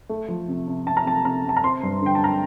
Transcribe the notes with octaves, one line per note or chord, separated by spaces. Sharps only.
A3
F3
C3
C3
C3 A5
A#5
C3 A5
C3 A#5
C3 A5
A#5
C4 C6
G2
D3 G5
A5
A#5